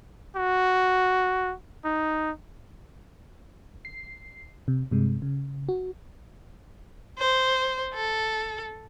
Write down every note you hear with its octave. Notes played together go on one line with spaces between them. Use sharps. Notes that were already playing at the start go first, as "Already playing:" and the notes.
F#4
D#4
C7
C3
G2 C3 G#3
C#3
F#4
C5
A4